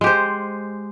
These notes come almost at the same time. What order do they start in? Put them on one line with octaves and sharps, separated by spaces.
G#3 G4 C5